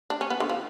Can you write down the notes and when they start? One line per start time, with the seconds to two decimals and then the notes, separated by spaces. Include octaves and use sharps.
0.10 D4
0.21 C#4
0.30 B3
0.40 D3
0.49 F3